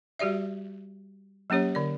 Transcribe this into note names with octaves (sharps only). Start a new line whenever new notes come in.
G3 F#4 G4 D5 E5
F#3 A#3 C#4 G4 C#5
D3 D5